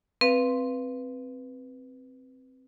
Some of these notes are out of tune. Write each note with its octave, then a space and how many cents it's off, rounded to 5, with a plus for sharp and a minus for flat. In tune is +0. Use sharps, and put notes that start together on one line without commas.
C4 +0 B4 -5 F5 -15